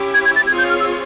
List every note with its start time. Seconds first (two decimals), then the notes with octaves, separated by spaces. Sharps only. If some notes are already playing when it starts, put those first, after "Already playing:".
Already playing: C#4 E4 G4
0.14 G#6
0.25 G#6
0.36 A6
0.47 C4 F4 G#4 C#5 G#6
0.58 G6
0.70 F6
0.80 E6